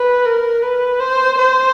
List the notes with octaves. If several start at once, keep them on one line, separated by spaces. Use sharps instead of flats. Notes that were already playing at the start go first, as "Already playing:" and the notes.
Already playing: B4
A#4
B4
C5
C5